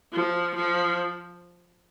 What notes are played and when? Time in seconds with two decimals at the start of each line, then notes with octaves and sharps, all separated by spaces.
0.13 F3
0.55 F3